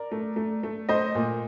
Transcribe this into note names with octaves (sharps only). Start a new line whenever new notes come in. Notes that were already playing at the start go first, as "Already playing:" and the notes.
Already playing: A#4 D5
A3
A3
A3
A3 C5 D#5
A#2